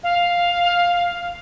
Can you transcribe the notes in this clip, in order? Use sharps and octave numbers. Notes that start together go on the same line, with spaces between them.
F5